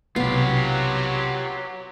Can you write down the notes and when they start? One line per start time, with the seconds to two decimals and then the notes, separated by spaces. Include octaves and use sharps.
0.16 B1 C3 F#3 B3 F4 G4